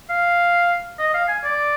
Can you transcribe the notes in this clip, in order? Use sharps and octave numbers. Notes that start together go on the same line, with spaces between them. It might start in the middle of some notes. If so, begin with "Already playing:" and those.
F5
D#5
F5
G#5
D5